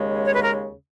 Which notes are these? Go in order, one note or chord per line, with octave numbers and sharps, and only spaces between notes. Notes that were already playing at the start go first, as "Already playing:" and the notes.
Already playing: D#2 C#3 G#3
C#5
B4
A#4